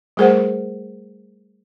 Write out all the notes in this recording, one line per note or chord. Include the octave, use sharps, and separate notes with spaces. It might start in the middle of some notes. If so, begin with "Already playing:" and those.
G3 A3 G#4 A#4 C5 F#5